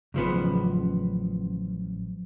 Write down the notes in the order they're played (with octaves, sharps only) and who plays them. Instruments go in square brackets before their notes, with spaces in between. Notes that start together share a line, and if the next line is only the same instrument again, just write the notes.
[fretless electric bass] A1 C#3 [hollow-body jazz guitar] F#2 F3 B3